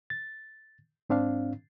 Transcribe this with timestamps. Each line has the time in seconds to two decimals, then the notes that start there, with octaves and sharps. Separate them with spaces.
0.10 A6
1.10 G#2 C4 D4 F5